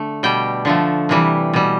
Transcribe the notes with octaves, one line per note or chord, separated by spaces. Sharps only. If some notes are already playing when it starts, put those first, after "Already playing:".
Already playing: D3 A3
B2 G3 G5
D3 F3 A3
C3 E3 G3
B2 G3